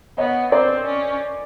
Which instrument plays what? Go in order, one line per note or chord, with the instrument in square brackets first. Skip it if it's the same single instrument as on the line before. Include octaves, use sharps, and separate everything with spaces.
[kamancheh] B3 [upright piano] C#5 D#5
[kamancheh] C4 [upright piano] C5 D5
[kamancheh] C#4